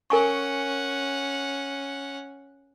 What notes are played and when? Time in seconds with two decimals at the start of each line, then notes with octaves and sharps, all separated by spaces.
0.10 C#4 A#4 F#5 G#5 C#6